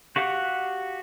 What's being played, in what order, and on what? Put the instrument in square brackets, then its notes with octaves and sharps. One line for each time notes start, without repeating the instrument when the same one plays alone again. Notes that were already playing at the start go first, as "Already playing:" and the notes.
[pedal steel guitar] F#4 G4 F5 F#5 F#6